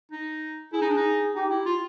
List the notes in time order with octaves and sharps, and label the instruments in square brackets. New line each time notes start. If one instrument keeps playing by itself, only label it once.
[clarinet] D#4
[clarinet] E4 [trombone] G#4
[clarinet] D#4
D4
D#4
[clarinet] D#4 [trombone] G4
[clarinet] E4
F4